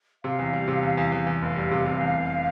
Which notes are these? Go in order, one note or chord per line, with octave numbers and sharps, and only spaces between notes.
C3 F5
E2
G3
C3
E2
E2
E2
E2
F1 F5
G3
C3
C3
E2
F1